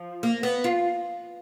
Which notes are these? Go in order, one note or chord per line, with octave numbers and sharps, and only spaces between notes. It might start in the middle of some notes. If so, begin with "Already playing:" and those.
Already playing: F3
A#3
B3
F4